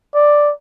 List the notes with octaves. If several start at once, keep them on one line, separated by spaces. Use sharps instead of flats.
D5